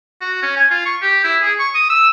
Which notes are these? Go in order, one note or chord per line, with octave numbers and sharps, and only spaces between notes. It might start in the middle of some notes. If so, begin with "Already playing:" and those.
F#4
C#4
G#5
F4
C#6
G4
E4
G#4
C#6
D#6
E6